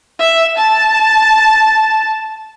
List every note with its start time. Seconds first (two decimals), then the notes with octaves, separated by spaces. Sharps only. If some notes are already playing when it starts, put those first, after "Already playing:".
0.19 E5
0.57 A5